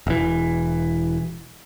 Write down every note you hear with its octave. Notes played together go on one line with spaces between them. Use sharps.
E1 E3